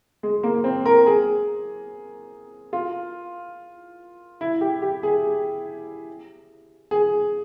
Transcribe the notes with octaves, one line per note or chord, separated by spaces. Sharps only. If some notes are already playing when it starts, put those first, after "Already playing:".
G#3
A#3
C4
A#4
G#4
F4
E4
G4
G4
G#4
G#4